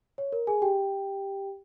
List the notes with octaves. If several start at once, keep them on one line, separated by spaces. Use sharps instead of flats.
C#5
A#4
G#4 G#5
G4 G5